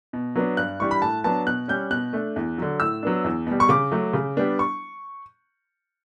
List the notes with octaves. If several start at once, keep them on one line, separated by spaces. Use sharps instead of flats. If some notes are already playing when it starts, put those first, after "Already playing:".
B2
F#3 B3 D4
G2 F#6
E3 G3 D4 C#6
B5
A2 A5
F#3 B3 D4 A5
B2 F#6
G3 C#4 G6
B2 F#6
A3 D4
E2
D3 F#3
A2 E6
F#3 B3 D4
E2
B2 G3
C#6
C#3 D6
F#3 A3
C#3
G3 B3 D4
C#6